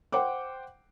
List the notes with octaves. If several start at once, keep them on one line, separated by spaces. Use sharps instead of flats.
C5 F#5 G5 D6